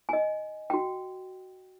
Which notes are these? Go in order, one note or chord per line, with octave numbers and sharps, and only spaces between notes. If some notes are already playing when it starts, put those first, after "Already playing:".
D#5 G#5
F#4 G5